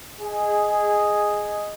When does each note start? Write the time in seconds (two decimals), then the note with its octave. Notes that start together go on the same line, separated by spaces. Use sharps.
0.20 G#4 D#5